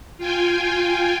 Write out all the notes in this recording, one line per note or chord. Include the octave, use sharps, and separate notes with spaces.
F4 G5 G#5